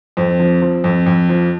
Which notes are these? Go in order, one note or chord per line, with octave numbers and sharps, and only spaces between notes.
F2 C4
F3
F3
F2
F2
F3